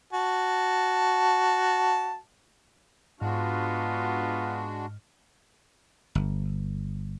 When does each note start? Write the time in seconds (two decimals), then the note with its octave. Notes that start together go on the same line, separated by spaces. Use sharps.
0.13 F#4 A5
3.20 G#2 G#3 B3 D4 F4 F#4 D#5 F6
6.15 G1